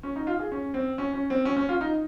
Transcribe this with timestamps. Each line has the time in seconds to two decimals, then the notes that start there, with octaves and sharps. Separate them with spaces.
0.03 C#4
0.16 D#4
0.27 F4
0.39 G#4
0.52 C#4
0.74 C4
0.98 C#4
1.13 C#4
1.30 C4
1.45 C#4
1.56 C#4
1.69 F4
1.81 D#4